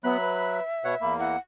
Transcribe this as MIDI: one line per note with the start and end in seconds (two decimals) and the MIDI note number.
0.04 0.60 54
0.04 0.17 59
0.04 1.13 76
0.04 0.60 83
0.04 0.60 90
0.20 0.62 71
0.84 0.95 47
0.84 0.96 71
0.84 0.95 73
0.84 0.95 78
1.01 1.36 40
1.01 1.36 58
1.01 1.18 83
1.19 1.36 64
1.19 1.38 78